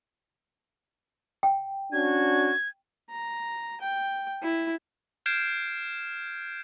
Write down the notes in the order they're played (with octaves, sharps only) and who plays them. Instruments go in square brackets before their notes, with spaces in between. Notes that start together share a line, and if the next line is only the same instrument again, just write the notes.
[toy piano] G5
[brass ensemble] C#4 D4 F#4 [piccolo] G#6
[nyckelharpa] A#5
G5
E4
[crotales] F6 G6 G#6 C7 D7 E7